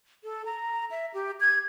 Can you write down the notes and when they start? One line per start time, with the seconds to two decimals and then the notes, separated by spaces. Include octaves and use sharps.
0.24 A4
0.46 A#5
0.91 E5
1.14 G4
1.41 G#6